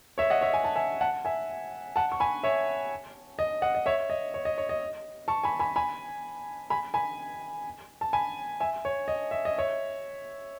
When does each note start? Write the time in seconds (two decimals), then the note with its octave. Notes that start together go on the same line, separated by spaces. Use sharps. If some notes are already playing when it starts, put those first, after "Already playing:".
0.18 C#5 E5
0.30 D#5 F#5
0.41 C#5 E5
0.54 G#5
0.64 A5
0.75 E5 G#5
1.01 F#5 A5
1.25 E5 G#5
1.96 F#5 A5
2.12 C#6
2.20 G#5 B5
2.44 C#5 E5
3.39 D#5
3.62 D#5 F#5
3.75 D#5
3.86 C#5 E5
4.10 D#5
4.34 C#5
4.45 D#5
4.58 C#5
4.69 D#5
5.28 A5 C#6
5.44 G#5 B5
5.59 G#5 B5
5.76 G#5 B5
6.70 G#5 B5
6.94 G#5 B5
8.01 A5
8.13 G#5 B5
8.60 E5 G#5
8.85 C#5
9.08 D#5
9.31 E5
9.45 D#5
9.58 C#5 E5